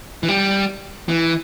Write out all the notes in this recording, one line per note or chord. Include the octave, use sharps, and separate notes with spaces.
E3
G3
E3